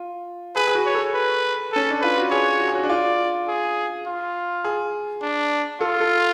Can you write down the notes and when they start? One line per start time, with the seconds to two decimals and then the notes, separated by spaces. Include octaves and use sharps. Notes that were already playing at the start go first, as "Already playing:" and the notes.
Already playing: F4
0.56 G#4 B4
0.67 G#4
0.75 F#4
0.86 C#5
0.95 A4
1.14 B4
1.73 C#4 A4
1.90 D4
2.01 F4 B4
2.17 F#4
2.31 G#4 C#5
2.60 F#4
2.68 G#4
2.75 F#4
2.83 D4
2.89 F4 D5
3.48 G#4
4.07 F4
4.64 G#4
5.22 D4
5.81 F4 A4
6.00 A4